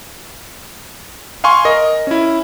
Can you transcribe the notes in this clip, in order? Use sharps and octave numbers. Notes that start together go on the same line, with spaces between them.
F5 G#5 C6 C#6
A#4 D#5
C#4 E4